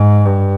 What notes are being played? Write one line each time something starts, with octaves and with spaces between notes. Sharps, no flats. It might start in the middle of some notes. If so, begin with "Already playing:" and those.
Already playing: G#2
G2